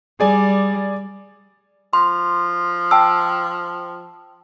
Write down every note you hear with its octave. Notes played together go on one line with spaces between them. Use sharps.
G3 G#4 D5 G#5
F3 C6
G5 A5 E6